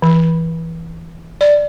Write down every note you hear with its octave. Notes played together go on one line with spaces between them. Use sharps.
E3
D5